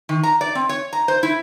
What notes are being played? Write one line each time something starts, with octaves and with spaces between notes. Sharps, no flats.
D#3
A#5
D5
C4
C#5
A#5
C5
E4